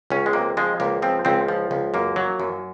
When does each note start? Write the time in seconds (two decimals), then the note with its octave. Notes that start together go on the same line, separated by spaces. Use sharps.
0.10 C#2 C#4
0.26 G#3
0.33 C3 A#3
0.57 F3 G#3
0.80 C#2 A#3
1.02 F3 C4
1.25 C#2 C4
1.48 F3
1.71 C#2
1.94 F#2 A#3
2.16 F#3
2.40 F#2